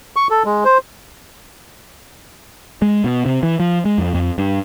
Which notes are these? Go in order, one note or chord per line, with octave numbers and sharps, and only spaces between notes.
C#6
A4
G#3
C5
G#3
B2
C3
E3
F3
G#3
F2
F2
G2